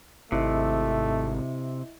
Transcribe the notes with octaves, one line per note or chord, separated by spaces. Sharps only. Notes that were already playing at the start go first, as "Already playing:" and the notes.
G#1 C3 A3 E4 D#5 E5